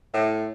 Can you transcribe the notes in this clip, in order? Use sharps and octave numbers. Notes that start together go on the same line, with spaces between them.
A2